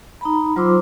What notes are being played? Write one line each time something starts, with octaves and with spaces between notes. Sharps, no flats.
D#4 A#5 B5
F#3 F4 C5 C6 D6 E6